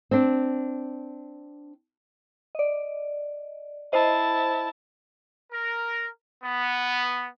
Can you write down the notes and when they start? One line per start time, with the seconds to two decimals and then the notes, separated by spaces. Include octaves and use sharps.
0.11 C4 D4
2.55 D5 D#5
3.93 E4 C5 D#5 A5
5.52 A#4
6.43 B3